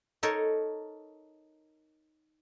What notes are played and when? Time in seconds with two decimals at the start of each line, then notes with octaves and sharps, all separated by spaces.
0.23 D#4 A4 A#4 C#5